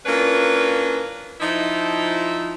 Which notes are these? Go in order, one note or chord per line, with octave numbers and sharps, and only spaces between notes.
A#3 C#4 D4 E4 F4 B4
F3 D#4 E4